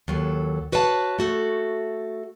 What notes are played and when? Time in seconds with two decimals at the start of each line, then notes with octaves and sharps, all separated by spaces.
0.08 D#2 F#3 A4
0.72 F#4 B4 C#5 F5 F#5 A5
1.19 A3 F#4 A4